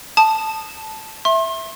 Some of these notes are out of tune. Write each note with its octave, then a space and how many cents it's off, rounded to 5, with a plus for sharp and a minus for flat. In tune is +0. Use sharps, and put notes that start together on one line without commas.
A5 +0 D#6 -20
E5 +0 C6 +35